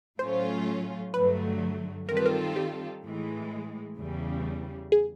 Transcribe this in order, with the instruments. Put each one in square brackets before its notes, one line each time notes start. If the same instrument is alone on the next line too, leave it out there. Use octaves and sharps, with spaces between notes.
[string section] A2 F#3 A3 C#4 F4 [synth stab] C5
[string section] G2 D3 F#3 A3 [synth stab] B4
[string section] D#3 G3 C4 F4 A4 [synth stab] A#4
[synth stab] B4
A#4
G4
[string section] A2 E3 G#3
E2 C#3 E3 G3
[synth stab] G#4